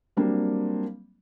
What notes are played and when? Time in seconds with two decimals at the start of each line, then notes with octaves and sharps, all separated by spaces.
0.17 F#3 G3 A#3 C4 D4